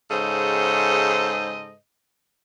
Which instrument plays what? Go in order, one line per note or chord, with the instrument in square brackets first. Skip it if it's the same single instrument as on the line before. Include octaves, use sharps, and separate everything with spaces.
[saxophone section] G#2 C#3 A4 C5 D#5